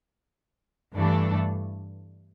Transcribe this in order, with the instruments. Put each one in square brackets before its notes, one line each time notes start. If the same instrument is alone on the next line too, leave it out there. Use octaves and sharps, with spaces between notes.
[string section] G2 E3 A3 D4 A4